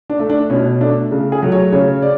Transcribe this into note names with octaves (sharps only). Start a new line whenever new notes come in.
D4
A3
D4
B2 C#4
A3 D4
C#3
G#4
F#3 A3
C#5
C#3 C#5
D5